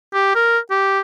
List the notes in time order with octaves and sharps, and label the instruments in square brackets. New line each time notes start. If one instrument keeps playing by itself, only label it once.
[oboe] G4
A#4
G4